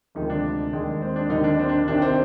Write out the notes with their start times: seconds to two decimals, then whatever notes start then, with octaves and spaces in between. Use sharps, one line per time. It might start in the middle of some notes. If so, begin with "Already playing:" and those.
0.15 D2 C3 D#3 F3 G#3 D#4
0.30 D4
0.73 D#2 D#3 G#3
1.02 C4
1.16 D4
1.29 D#2 D3 D#3 G3 D#4
1.44 D4
1.59 C4
1.69 D4
1.87 C2 C3 D#3 D4
2.02 C4